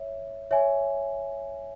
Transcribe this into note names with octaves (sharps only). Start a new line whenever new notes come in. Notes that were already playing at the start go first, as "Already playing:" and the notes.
Already playing: C#5 E5
C#5 E5 G#5